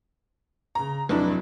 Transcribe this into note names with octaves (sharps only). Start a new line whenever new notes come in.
C#3 A#5
F1 F#3 D4 E4